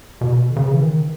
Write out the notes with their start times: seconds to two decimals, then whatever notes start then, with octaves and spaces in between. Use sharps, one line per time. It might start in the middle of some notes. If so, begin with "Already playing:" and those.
0.21 B2
0.50 D3
0.56 C#3
0.73 E3
0.80 D#3